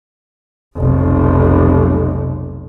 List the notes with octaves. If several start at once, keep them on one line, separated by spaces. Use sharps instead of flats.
F1 B1